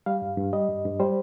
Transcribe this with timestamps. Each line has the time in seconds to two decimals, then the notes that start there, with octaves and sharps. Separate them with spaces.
0.06 G3 F5
0.22 G2
0.37 G2
0.53 G3 D#5
0.69 G2
0.85 G2
1.00 G3 C5